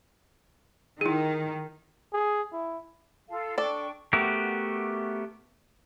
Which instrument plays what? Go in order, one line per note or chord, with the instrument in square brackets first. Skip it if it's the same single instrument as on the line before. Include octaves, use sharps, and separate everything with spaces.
[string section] D#3 [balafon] E4 G#4
[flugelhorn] G#4
E4
[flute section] F4 A4 F5
[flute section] D4 G5 C#6 [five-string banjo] A4 D5
[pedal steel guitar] A3 B3 F#4 G4 A#4